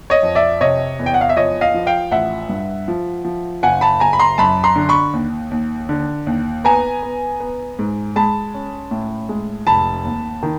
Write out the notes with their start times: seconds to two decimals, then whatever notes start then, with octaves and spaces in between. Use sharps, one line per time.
0.10 C#5 D#5
0.23 F2
0.35 D5 E5
0.61 C3 C#5 D#5
0.99 E2
1.06 G5
1.14 F#5
1.21 F5
1.29 E5
1.36 F3 C#5 D#5
1.61 D#5 F5
1.74 F3
1.87 F5 G5
2.11 A1 E5 F#5
2.49 G2
2.88 F3
3.25 F3
3.63 F#1 F#5 G#5
3.81 A5 B5
4.00 F#1 G#5 A#5
4.13 B5
4.19 A#5 C6
4.38 F#2 A5 B5
4.64 A#5 C6
4.76 D3
4.89 B5 C#6
5.13 D#2
5.51 D#2
5.89 D3
6.27 D#2
6.64 B3 G#5 A#5
7.03 B3
7.40 B3
7.79 G#2
8.16 G#3 A5 B5
8.54 C#4
8.91 A2
9.29 G#3
9.67 F1 A5 B5
10.05 D#2
10.43 D#3